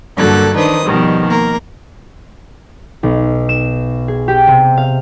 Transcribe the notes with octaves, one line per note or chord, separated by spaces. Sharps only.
G2 D3 F#3 A#3 A4 F#6
D#3 D4 D#4 B4 C5 D#6
B2 D#3 F3 G3
A#3 A#4
B1
E7
G#4
G4
C3
F5